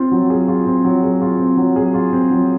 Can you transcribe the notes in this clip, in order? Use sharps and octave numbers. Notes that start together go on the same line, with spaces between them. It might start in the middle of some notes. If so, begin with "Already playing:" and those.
Already playing: C4 F4
F#3
G#4
F4
C4
F#3
G#4
F4
C4
F#3
G#4
F4
C4
F#3